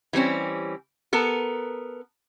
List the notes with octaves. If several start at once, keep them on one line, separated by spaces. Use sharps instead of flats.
E3 G3 C4 C#4
B3 A4 A#4